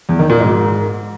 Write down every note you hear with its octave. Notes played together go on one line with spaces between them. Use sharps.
E2
D#3
A#2
G#2